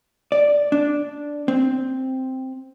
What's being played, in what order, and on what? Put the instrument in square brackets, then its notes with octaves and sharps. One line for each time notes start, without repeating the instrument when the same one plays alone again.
[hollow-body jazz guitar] D5
D4
C4